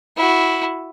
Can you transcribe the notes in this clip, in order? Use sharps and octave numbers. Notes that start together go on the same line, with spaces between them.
E4 F#4